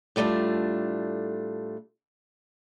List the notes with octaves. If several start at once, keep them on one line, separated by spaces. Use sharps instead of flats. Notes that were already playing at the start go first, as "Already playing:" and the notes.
A2 G3 A3 D4 F4